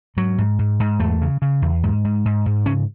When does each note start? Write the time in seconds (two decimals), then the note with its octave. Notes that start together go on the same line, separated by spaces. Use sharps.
0.17 G#2 F#3
0.38 G#2
0.59 G#2
0.80 G#2
0.99 E2 A3
1.21 C#3
1.42 C#3
1.62 E2
1.83 G#2
2.05 G#2
2.25 G#2
2.46 G#2
2.66 C#3 C#4